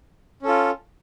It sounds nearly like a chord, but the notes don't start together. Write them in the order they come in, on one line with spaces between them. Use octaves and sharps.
C#4 A4 F4